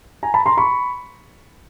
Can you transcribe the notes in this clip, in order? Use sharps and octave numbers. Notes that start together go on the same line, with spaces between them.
G#5 A#5
A5 B5
A#5 C6
B5 C#6